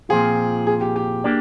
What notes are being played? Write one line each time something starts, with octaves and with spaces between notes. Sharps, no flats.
A#2 F3 C4 F4 G#4
G#4
G4
G4
A#3 D4 G4 D5